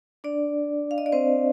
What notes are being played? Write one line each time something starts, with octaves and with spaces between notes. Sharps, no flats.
D4 D5
F5
D#5
D5
C4 C5